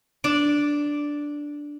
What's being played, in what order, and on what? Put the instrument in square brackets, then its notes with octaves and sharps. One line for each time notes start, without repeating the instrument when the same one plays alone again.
[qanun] D4 D5 D6